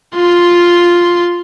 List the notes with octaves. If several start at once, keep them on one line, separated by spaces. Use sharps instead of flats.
F4 C6